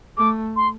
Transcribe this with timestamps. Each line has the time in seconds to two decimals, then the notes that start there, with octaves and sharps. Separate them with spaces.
0.17 A3 D6
0.56 C6